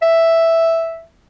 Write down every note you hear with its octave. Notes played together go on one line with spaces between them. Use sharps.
E5